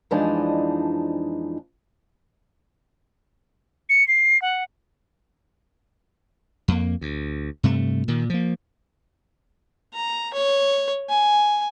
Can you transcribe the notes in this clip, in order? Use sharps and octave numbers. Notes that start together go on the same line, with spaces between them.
F2 E3 F3 G#3 D4 D#4
C#7
C7
F#5
F2 A#3
D2
G2 C3 A3
A#2 D#3
F3 A#3
A#5
C#5
G#5